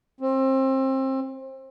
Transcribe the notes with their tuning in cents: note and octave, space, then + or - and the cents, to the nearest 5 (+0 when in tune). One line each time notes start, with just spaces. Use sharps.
C4 +25